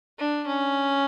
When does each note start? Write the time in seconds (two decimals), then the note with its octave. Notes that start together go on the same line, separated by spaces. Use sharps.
0.18 D4
0.47 C#4